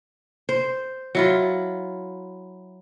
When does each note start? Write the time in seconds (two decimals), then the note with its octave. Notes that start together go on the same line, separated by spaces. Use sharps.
0.49 C5
1.15 F#3 E4 F4